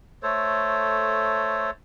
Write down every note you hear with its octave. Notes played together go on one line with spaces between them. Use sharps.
A3 A4 C5 C#5